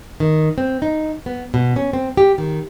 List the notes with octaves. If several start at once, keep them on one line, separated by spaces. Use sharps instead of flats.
D#3
C4
D#4
B3
B2
C#4
C4
G4
D#3